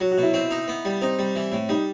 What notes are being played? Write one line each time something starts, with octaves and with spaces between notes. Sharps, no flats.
F#3 F#4
F#4
B2
E4
C4
D#4
B3
G3
C4 D#4
G3
E3
A2
G3 D#4